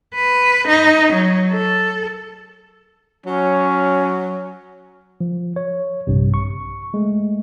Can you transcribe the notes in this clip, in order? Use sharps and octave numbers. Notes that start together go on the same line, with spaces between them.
B4
D#4
F#3
A4
F#3 C#4
F3
C#5
A#1 G2 C3
C#6
G#3 A3